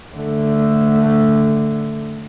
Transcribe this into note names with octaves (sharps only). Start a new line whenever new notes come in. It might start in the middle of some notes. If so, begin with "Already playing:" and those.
D3 A3